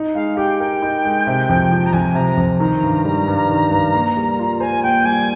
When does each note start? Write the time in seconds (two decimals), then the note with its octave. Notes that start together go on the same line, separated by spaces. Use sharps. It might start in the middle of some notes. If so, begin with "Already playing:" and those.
Already playing: D#4
0.15 G#3 F5
0.37 G4 G5
0.59 A#4 G5
0.82 D#4
1.05 G#3
1.27 C3
1.49 F2
1.71 F3
1.86 A#5
1.93 F2 G#5
2.15 C3 A#5
2.37 F2
2.60 D#3 A#5
2.83 G2
3.05 G3
3.28 G2
3.50 D#3
3.71 G2
3.94 A#3
4.17 G3
4.39 F4
4.60 C5 G#5
4.83 A#3 G5
5.05 G3 G#5